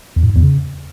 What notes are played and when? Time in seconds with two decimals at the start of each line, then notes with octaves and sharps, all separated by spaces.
0.16 E2
0.23 A2
0.30 G#2
0.36 E2
0.43 C#3